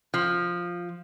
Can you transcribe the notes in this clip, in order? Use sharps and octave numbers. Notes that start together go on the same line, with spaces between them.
F3